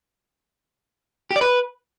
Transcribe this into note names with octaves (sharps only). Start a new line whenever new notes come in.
G4
D5
B4